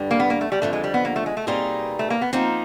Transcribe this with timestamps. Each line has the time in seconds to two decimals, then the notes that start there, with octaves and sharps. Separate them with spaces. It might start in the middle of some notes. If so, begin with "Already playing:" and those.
Already playing: G2 D3 G3
0.11 A#3
0.20 B3
0.30 A#3
0.41 A3
0.52 G3
0.62 F2 D3 F3 A3
0.73 G#3
0.84 G3
0.94 B3
1.05 A#3
1.16 A3
1.26 G#3
1.37 A3
1.47 B2 G3 A#3 C4 D#4 G#4
1.99 A3
2.10 A#3
2.21 B3
2.33 F3 A#3 C4 D#4